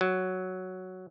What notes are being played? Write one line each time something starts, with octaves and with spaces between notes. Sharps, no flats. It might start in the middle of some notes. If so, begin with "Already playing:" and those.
F#3